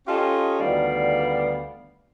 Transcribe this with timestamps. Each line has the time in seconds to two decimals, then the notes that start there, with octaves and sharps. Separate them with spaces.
0.07 C#4 F4 G4 A4 D#5
0.60 D2 D#3 G3 B3 D5 F5